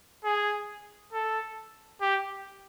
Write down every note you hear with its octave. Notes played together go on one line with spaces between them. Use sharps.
G#4
A4
G4